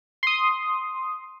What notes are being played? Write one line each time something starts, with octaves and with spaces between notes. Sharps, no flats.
C6 D#6